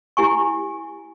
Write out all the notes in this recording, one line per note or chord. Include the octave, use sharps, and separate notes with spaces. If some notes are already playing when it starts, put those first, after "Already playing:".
E4 G4 G#5 C#6